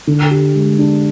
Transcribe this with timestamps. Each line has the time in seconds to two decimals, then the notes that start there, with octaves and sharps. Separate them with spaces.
0.07 D3
0.31 G4
0.55 G#3
0.79 D4